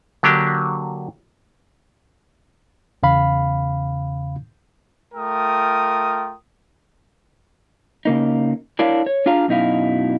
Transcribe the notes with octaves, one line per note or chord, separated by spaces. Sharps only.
D3 F#3 A#3 D4 G4
E2 C#3 F5 B5
A3 F4 A#4 G5 D#6
C#3 A#3 D#4
D4 E4 A#4 C#5 F5
C#5
D4 F4 G#4 F5 A#5
F#2 B2 D#4 E4 F5